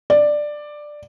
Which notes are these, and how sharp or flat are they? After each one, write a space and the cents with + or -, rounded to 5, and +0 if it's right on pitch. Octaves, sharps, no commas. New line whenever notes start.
D5 +10